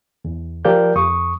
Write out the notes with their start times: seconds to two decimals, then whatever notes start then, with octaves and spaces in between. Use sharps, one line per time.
0.25 E2
0.65 F3 G4 A#4 D5 F5 G6
0.96 F2 C#6 D#6